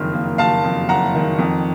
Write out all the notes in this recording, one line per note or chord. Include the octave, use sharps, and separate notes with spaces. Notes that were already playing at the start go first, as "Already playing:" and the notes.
Already playing: F#1 F2 D#3 F6
A#3
F#1 F5 A5
F2
F#1 F#5 A#5
D#3
F2